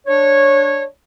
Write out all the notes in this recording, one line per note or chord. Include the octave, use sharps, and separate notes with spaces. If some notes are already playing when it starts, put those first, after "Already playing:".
D4 C#5